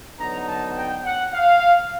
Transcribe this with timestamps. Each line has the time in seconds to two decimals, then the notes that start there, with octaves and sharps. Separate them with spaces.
0.19 D3 F#3 B3 D#4 A#5
0.47 A5
0.76 G5
1.05 F#5
1.34 F5